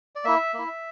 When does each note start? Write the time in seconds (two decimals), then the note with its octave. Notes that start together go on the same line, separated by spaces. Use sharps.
0.15 D5
0.25 A#3 E4 E5
0.54 A#3 E4